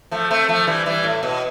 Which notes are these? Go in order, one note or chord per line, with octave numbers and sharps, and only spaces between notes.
F3 A3
A3 C4
F3 A3
E3 G3
E3 G3
A2
B2